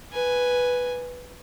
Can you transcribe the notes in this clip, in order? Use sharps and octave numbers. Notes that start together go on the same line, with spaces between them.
B4 G#5